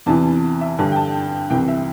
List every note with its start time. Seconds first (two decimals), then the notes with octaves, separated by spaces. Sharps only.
0.06 E2 C3 E3 A5
0.61 E5
0.78 G2 D3 A5
0.92 G5
0.96 A5
1.50 C2 C3 E3 G5
1.68 E5